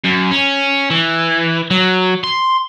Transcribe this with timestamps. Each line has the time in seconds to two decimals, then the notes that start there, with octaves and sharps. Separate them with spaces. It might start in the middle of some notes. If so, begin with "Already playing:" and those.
0.05 F#2
0.31 C#4
0.90 E3
1.71 F#3
2.24 C6